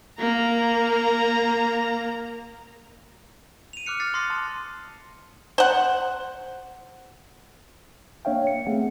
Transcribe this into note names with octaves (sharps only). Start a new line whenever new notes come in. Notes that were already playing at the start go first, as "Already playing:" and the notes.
A#3 A#5
D#7 F7
D6 F6 F#6 C#7
F6 A6 C7
C6 D#6 A#6 C7
A5
C5 F#5
A#3 D4 C#5 E5 F5 G5
C#7
A3 B3 C4 G#4 E5 F#5